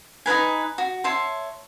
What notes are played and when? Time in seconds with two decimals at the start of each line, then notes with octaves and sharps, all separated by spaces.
0.26 D#4 E4 B4 G#5
0.78 F#4
1.04 C#5 E5 A5 C6